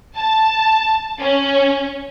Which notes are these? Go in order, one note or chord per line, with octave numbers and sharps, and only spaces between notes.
A5
C#4